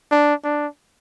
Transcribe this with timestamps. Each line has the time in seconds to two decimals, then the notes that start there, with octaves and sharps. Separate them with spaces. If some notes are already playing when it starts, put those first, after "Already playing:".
0.11 D4
0.44 D4